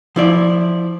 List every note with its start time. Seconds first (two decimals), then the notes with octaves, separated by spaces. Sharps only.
0.16 F3 E4 D5